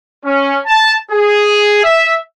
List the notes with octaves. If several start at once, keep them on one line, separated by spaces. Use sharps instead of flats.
C#4
A5
G#4
E5